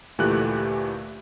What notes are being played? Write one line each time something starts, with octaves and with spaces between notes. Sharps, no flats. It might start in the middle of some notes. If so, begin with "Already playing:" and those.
D2 A#2 E3 A3 G4 F#6